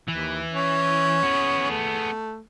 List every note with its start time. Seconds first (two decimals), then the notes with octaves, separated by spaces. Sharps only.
0.08 D#2 E3
0.51 C#4
1.23 B3 G#4
1.70 A3